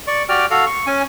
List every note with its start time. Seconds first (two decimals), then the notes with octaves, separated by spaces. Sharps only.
0.07 D5 C#6
0.29 F#4 G4 D5 G5 F6
0.51 F#4 A4 F5
0.66 C#6
0.87 C#4 G#5